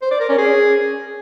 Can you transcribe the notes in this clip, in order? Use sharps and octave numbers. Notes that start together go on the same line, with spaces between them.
C5
D5
A#4
C#4
G#4